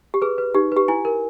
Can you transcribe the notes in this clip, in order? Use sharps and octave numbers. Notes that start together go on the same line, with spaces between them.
G4
G#4 B4
B4
D#4 G4
G4 B4
E4 G#5
A#4